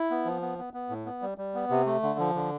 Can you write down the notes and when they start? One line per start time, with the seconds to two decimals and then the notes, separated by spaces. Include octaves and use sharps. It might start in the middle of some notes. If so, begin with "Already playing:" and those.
Already playing: E4
0.10 B3
0.25 F3
0.42 B3
0.59 B3
0.74 B3
0.90 A2
1.06 B3
1.22 G3
1.38 G3
1.55 B3
1.70 C3
1.86 A3
2.03 D3
2.19 F3
2.35 D3